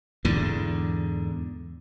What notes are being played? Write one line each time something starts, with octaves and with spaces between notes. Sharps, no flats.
E2 G#2 D3